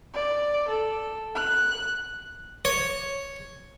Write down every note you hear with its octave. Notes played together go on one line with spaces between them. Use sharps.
D5
A4
F#6
C#5